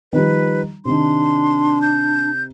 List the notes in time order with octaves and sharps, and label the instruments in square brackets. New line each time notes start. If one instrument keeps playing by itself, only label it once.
[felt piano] D#3 F3 G3 [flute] B4
[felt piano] C3 D#3 [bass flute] D4 [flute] C6
[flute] G6